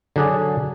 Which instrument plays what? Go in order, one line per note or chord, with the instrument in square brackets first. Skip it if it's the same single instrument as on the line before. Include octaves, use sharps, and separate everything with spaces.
[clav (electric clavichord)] D3 F#3 D4 G#4 D5